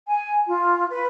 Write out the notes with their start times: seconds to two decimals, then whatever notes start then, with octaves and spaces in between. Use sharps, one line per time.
0.08 G#5
0.48 F4
0.90 B4